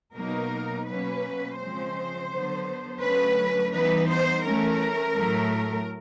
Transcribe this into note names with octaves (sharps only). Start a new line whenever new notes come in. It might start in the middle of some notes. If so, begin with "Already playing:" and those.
B2 F#3 A#3 D#4 A#4
B2 F#3 A#3 C#4 B4
C#3 F3 G#3 C4 C5
D3 F#3 B3
D3 F#3 A3 C#4 B4
E3 G3 B3 D#4 B4
C5
E3 A3 C#4 A#4
A2 F#3 A3